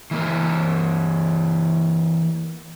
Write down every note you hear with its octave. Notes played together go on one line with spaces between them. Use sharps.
E3 A#3 A#4